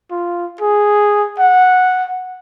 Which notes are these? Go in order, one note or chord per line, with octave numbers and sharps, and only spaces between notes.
F4
G#4
F#5